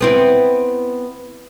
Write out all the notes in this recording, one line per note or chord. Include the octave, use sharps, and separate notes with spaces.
B3 C4 E4